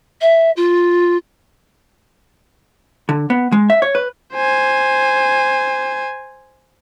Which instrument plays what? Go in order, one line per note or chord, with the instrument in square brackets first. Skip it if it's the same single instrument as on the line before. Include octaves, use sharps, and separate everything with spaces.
[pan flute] E5
F4
[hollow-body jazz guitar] D3
B3
G#3
E5
C#5
B4
[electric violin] C5 G#5